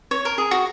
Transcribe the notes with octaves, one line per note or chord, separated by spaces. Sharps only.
C#5
A#4
G#4
F#4